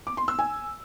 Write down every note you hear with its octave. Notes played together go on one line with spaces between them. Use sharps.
D6
C6
E6
G#5